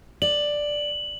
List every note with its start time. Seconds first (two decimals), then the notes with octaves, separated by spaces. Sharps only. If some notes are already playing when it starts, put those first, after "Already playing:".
0.22 D5 F#7